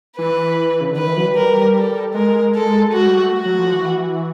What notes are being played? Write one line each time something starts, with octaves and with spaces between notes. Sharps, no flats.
E3 B4
C#3
D3
D#3 B4
E3
F#3
G3
A#4
A4
G#3 A#4
A4
G#3 F#4
G3
A3
F#4
F#3
F3
E3